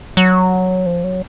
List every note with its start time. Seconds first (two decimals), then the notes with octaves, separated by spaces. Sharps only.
0.17 F#3
0.86 F3
1.04 F#3